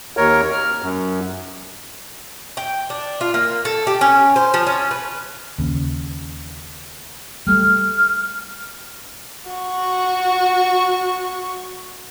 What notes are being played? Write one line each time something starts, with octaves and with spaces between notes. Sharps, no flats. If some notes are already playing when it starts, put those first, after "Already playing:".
D#2 A#4 C#5
F6
F#2
G5
D4
F4
A#3
A4
G4
C#4
C5
F3
C#4
B4
D#2 C#3
G3 A3 F6
F#4 C#6